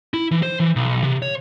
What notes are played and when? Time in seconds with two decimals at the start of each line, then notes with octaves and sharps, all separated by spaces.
0.14 E4
0.31 E3
0.43 C5
0.60 E3
0.76 B1
1.04 C3
1.22 C#5